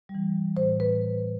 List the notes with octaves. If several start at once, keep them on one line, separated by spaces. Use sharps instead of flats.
G3
E3
A2 C5
B4